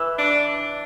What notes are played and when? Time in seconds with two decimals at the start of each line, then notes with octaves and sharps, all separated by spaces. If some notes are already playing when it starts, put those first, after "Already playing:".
Already playing: E3
0.18 D4